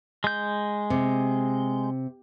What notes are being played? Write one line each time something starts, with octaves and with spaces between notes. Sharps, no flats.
G#3 G6
C3